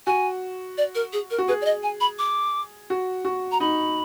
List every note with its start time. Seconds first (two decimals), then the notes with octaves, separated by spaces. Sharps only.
0.07 F#4 G#5
0.78 D5
0.95 A#4
1.13 G#4
1.31 A#4
1.38 F#4
1.48 G#4 B4
1.61 D5
1.65 D#5
1.83 G#5
2.01 B5
2.19 D6
2.90 F#4
3.25 F#4
3.52 A#5
3.60 D#4 B5